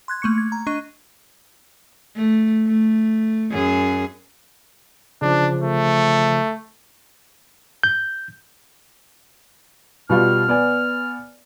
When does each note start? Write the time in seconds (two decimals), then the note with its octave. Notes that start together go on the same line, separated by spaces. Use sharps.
0.08 C6 F#6 G#6
0.22 A3 A#3 C#6 C#7
0.38 G#6
0.52 A#5
0.67 D4 D#5 C#6 D#7
2.15 A3
2.67 A3
3.51 F#2 G#4
5.22 C#3 F3 D4
5.62 A3
7.83 G6
10.10 B2 G3 F4 F6
10.48 B3 D5 G#5